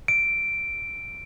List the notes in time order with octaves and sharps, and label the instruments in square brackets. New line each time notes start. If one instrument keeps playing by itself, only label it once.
[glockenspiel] D7